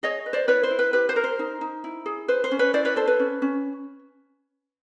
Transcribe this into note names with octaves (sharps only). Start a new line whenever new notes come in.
G#4 C#5 D#5
B4
C5 D5
E4 B4 C#5
C5
E4
B4
G4 B4
C5
A#4
C5
D#4
D#4
E4
G#4
B4 C5
C5
C#4
B4 C#5
E4 C5 D5
B4 C#5
A4 C5
B4 C#5
C#4
C#4